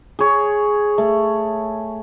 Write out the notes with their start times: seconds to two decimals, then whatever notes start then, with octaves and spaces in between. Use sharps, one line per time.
0.19 G#4 C#5
0.98 A3